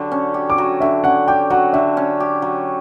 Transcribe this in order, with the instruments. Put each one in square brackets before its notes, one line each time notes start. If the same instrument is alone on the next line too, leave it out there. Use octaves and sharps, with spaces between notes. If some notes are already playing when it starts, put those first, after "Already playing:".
Already playing: [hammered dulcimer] D3 F#3 G4
C#4
G4
[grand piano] D6
[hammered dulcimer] F#3
[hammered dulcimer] D3 [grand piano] E5
[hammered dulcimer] C#4 [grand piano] F#5
[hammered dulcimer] G4 [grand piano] G5
[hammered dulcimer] F#3 [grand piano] F#5
[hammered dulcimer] D3 [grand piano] E5
[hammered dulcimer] C#4
G4
F#3